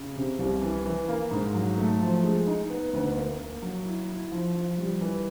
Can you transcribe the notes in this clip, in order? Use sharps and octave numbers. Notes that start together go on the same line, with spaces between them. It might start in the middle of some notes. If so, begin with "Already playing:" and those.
Already playing: C#3
C3
C2
E3
E3
A#3
G#2
F#3
A3
F3
G#3
D#4
B3
D2
A#3
A#3
F#3
E4
E4
F3
F3
G3
E3